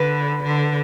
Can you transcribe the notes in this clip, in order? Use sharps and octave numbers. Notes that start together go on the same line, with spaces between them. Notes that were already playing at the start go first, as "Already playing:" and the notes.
Already playing: D3 B4
D3